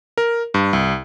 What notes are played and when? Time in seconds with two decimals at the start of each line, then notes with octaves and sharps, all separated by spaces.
0.18 A#4
0.54 G2
0.73 C2